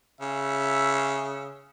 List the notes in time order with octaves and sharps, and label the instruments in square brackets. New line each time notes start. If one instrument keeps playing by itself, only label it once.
[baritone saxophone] C#3 [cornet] E5